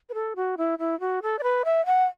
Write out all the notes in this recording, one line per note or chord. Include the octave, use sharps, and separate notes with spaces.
B4
A4
F#4
E4
E4
F#4
A4
D5
B4
E5
F#5